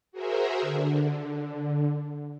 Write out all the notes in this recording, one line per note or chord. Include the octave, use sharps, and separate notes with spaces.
F#4 G#4 A#4 C5 E5
D3